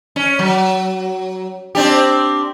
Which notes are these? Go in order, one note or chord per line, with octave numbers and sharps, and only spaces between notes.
C#4
F#3
C4 D4 G4